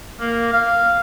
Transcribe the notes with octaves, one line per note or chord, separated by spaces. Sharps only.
A#3
F5